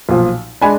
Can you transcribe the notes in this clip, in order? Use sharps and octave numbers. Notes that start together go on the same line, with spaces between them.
B1 A#2 F3
G#3 D4 G#5 B5